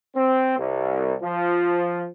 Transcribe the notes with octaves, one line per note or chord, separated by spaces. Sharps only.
C4
C2
F3